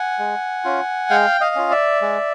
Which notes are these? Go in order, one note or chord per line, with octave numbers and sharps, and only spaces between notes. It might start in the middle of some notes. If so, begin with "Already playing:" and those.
Already playing: F#5 G#5
G#3
C#4 F4
G#3 F5 G5
D#5 F5
C#4 F4
D5 E5
G#3